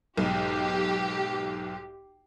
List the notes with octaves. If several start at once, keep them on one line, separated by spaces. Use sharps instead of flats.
B1 G#2 G4